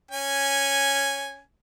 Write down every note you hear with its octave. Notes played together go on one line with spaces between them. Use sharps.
C#4 G#5